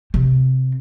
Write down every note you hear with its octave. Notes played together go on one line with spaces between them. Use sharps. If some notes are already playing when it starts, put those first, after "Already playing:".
C3 C4